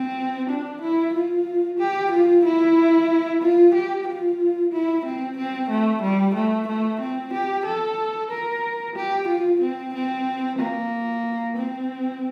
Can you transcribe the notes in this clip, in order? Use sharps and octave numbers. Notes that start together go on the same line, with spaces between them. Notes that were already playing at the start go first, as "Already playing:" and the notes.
Already playing: C4
D4
E4
F4
G4
F4
E4
F4
G4
F4
E4
C4
C4
A3
G3
A3
A3
C4
G4
A4
A#4
G4
F4
C4
C4
A#3
C4